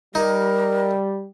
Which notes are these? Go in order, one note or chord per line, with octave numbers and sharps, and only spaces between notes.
G3 D#4 A#4